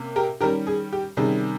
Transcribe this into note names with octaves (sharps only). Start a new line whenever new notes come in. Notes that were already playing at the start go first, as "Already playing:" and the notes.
Already playing: C3 A#3 C#4
G4 A#4
D#3 G3 C#4 G4 A#4
G#4
G4
C3 D#3 G3 C#4 G#4